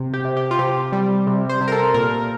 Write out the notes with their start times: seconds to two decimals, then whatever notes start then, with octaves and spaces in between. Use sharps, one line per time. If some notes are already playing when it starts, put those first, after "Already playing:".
Already playing: C3
0.14 G4
0.25 C3
0.37 G4
0.51 F4
0.59 C3 G4
0.92 G3
1.27 C3
1.49 C5
1.61 C3
1.68 A#4
1.72 A4
1.94 A#2 A#4